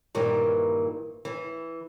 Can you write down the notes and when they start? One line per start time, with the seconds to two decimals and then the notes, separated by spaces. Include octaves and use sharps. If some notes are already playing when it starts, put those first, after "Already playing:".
0.15 G2 A#2 D#3 E3
1.25 E3